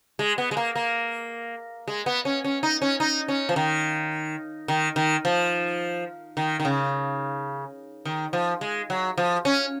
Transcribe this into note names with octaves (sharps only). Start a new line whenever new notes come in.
G#3
B3
G#3
A#3
A#3
G#3
B3
C#4
C#4
D#4
C#4
D#4
C#4
F3
D#3
D#3
D#3
F3
D#3
D#3
C#3
D#3
F3
G#3
F#3
F3
C#4